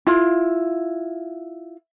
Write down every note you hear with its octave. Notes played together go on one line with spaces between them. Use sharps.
E4 F4